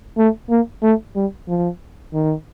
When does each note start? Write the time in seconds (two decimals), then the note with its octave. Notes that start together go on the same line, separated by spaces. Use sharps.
0.18 A3
0.50 A#3
0.83 A3
1.16 G3
1.48 F3
2.13 D#3